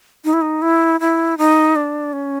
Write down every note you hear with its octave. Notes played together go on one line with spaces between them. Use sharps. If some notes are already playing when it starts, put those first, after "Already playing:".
D#4
E4
D#4
E4
E4
D#4
D4
C#4